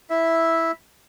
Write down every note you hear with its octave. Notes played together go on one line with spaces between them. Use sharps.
E4 E5